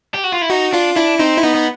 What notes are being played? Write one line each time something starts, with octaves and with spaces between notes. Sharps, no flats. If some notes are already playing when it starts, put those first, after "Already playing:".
G4
F#4
F4
E4
D#4 F#4
D4 F4
D4 E4
C4 D#4
E4
B3 D#4
B3